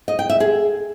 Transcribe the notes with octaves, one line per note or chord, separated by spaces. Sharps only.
D#5
G5
E5
G#4